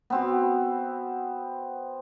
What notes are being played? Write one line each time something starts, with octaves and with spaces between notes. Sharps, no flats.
B3 C4 F#4